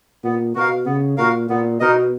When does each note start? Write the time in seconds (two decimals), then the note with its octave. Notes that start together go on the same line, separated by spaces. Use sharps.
0.24 A#2 B3
0.55 B2 F#4 A#4 F5
0.86 C#3 B3
1.17 A#2 F#4 A#4 F5
1.50 A#2 B3
1.80 B2 D#4 A#4 D#5